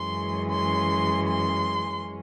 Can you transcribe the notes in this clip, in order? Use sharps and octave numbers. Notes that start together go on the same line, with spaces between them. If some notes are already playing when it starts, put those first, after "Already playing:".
Already playing: F#2 E3 G#3 C#4 C6
C6
C6